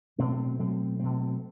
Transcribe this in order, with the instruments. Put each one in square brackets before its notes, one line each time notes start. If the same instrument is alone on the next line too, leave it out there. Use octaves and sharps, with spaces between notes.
[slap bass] B2 F#3 A3 C4
B2 F#3 A3 C4
B2 F#3 A3 C4